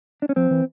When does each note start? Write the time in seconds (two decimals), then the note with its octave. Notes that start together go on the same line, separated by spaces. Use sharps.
0.22 D4
0.29 C#4
0.36 F3 C4
0.51 E3